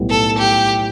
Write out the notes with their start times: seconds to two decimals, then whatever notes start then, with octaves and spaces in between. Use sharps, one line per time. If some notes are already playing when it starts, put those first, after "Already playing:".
Already playing: B1 A2 G3 B3
0.10 A4
0.39 G4